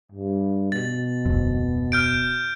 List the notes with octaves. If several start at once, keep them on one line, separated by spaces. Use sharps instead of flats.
G2
B2 A6
D1 F2
F6 G6 D7